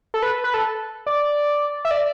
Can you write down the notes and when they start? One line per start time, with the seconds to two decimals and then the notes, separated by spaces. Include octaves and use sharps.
0.14 A4
0.23 B4
0.44 B4
0.54 A4
1.06 D5
1.85 E5
1.91 D5